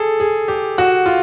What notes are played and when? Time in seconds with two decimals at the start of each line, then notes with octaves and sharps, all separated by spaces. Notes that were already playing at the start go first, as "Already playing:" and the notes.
Already playing: G#4 A4
0.20 G#4
0.48 G4
0.78 F#4
1.06 F4